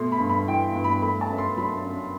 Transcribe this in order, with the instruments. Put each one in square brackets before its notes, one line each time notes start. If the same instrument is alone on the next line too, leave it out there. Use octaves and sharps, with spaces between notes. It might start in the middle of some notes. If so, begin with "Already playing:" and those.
Already playing: [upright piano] B2 A3 C6
B5
G2
B5
E3 G5
G2
B5
A3 B5
A5
F#2
C6
F#3 B5
F#2